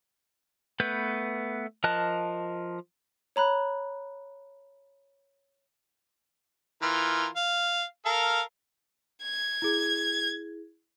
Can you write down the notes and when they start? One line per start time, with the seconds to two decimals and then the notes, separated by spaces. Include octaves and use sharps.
0.80 A3 B3 B4 G6
1.84 F3 A#4 D#5 A5 F#6
3.36 C#5 A#5 B5 F#6
6.82 E3 F4 A#4
7.36 F5
8.06 A4 A#4 F5
9.23 G#6
9.62 E4 G#4